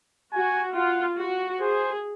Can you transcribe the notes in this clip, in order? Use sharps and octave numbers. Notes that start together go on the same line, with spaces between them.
F#4 G#5
F4 F#5
F#4
G#4 C5